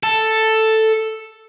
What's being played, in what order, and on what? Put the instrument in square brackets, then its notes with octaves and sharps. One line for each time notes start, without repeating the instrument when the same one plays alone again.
[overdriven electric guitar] A4